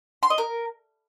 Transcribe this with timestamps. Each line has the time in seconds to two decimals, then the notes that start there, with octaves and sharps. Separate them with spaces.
0.23 C6
0.30 D#5
0.38 A#4